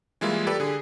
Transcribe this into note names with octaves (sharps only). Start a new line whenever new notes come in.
E3 G3 G#3 A#3 E4 F4
G4 A4 B4 D5
D3 G#4